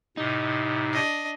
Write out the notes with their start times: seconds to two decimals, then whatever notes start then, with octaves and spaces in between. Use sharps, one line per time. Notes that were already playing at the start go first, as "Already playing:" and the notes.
0.17 A2 C3 D#4
0.94 D4 D#5